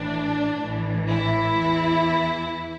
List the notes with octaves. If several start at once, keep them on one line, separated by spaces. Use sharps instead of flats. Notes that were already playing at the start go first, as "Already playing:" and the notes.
Already playing: A1 A2 E3 D4
A1 A2 E3
E4
E2 E3